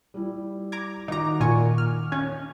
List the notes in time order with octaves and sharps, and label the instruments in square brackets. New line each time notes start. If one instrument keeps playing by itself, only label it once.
[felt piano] G3 E4
[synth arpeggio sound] A#5 D6 G#6
[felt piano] D#3 F#4 D6 [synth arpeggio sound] D#4 A#5
[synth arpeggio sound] A#2 G#5 C#6
F6
[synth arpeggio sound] C#4 [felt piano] G#6